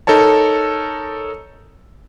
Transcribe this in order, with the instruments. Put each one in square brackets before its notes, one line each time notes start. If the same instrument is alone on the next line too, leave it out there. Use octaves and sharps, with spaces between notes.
[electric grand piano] D#4 A4 A#4 C#5 A5